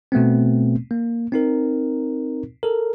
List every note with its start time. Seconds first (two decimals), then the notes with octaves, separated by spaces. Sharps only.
0.12 B2 A3 B3 C4
0.91 A#3
1.32 C4 D#4 A#4
2.63 A4 A#4